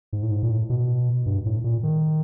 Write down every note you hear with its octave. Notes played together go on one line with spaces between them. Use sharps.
G#2
A2
G#2
A#2
A2
B2
G2
A2
A#2
D#3